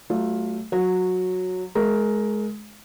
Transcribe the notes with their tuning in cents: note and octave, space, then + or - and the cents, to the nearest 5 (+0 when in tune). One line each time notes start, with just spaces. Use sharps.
F#3 +35 A3 +0 F4 +15
F#3 -10 F#5 -30
G#3 +25 A#4 +0